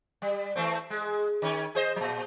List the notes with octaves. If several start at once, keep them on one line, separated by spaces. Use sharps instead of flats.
G3
E3 A3 C4
G#3
D#3 C#4
G#4 C5 D#5
A#2 F#3